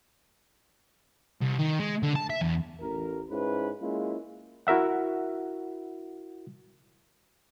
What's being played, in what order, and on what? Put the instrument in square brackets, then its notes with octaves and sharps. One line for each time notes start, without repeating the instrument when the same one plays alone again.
[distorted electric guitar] C2
D#3
G#3
D3
A5
E5
E2
[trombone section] A1 A#4
G#2 C#4 E4 B4
G#3 A#3 C#4 E4 F4
[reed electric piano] E4 F#4 A#4 E5 F#5